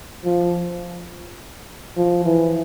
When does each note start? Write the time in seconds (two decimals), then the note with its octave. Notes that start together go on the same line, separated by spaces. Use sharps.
0.25 F3
1.97 F3
2.25 E3